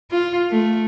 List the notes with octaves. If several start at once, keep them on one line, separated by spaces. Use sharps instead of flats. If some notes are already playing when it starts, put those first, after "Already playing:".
F4
A3